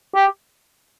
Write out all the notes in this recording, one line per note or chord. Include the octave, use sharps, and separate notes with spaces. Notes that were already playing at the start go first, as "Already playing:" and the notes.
G4